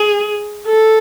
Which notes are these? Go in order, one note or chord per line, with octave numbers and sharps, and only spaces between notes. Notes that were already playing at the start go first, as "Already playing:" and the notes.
Already playing: G#4
A4